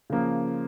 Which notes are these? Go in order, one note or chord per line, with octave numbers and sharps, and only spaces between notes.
C#3 F3 A#3